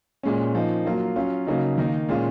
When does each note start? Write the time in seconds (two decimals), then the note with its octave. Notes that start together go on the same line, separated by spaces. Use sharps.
0.23 A#2 G#3 C#4
0.55 F3 A#3 D#4
0.86 F#3 A#3 F4
1.16 F#3 C#4 F4
1.47 C#3 F#3 A#3 D#4
1.78 D#3 A#3 D#4
2.09 A#2 G#3 C#4 F4